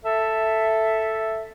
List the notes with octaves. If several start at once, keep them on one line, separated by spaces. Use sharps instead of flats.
A4 E5